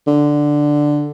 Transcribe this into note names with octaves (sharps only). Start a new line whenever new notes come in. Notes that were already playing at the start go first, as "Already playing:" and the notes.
D3